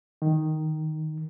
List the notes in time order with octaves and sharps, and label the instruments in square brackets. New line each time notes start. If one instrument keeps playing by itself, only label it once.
[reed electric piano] D#3